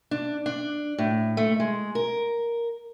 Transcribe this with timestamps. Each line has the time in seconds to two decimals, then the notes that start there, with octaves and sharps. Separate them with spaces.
0.11 D4
0.46 D4
0.98 A2
1.37 A3
1.60 G#3
1.95 A#4